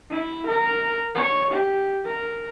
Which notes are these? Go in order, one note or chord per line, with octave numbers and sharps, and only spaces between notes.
E4
A#4
C#5
G4
A#4